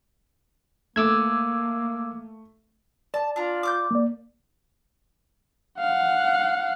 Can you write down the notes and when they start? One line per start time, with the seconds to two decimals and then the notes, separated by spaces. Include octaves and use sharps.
0.96 A3 A#3 D6 E6 G#6
3.14 D5 A5
3.36 D4 F4 A#5
3.63 D6 F6 G6
3.91 A#3 D5
5.80 F5 F#5